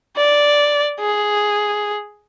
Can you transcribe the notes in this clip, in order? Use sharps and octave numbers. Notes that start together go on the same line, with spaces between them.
D5
G#4